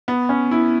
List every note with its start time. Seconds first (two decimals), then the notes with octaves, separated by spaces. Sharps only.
0.08 B3
0.29 C#4
0.51 E4